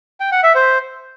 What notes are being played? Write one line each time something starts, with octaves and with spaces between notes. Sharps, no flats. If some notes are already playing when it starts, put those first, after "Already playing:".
G5
F#5
E5
C5